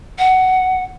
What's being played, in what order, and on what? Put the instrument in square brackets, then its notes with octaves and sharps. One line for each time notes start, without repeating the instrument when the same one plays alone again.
[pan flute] F#5